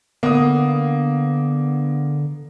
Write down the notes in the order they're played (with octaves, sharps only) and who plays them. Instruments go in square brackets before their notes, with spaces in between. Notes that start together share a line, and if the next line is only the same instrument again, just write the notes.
[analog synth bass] D3 [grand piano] A#3 D#6 [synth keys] B3